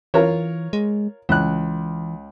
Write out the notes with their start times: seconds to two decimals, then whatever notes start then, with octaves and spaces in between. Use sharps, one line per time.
0.14 E3 F4 A#4 C#5
0.73 G#3
1.29 C#2 E3 F#6